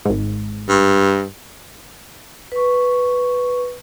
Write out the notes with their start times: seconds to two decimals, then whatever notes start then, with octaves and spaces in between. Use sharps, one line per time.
0.05 G#1 G#2
0.69 G2
2.52 B4 C#6